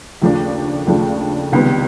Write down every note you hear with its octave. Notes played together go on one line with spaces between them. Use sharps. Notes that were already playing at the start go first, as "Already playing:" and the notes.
D#2 C#3 F3 A3 D4
D#2 C#3 F3 A3 D4
C#2 C3 D#3 G3 B3